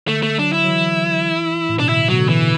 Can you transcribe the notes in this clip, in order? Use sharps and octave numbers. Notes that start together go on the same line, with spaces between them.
D3 A3
A3
F#3 D4
E4
F#3
E3
A2
B2 D4
D3 E4
B2 F#3
D3
E3